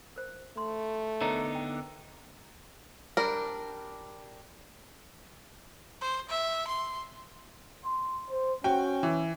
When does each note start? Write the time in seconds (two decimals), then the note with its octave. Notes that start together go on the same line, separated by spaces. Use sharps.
0.16 A#4 C5
0.57 A3 C6
1.21 D3 B3 D#4 A#4 C#5 A#5
1.55 G5
3.17 G3 D4 A#4
6.01 C5
6.30 E5
6.68 C6
7.85 C6
8.31 C5
8.64 C#4 F#4 G5
9.03 E3